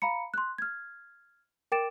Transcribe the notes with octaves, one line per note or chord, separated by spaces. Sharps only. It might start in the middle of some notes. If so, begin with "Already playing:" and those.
F5 A#5 B5 C#7
C6 F#6
F6 G#6
A#4 G5 D6 A6 D7 E7